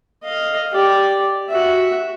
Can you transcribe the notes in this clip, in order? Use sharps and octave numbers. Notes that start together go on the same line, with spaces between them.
D#5 F5
G4 D5
F#4 E5